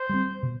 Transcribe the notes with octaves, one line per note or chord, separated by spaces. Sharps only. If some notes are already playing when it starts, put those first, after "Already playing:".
Already playing: C5
G3 C4
B2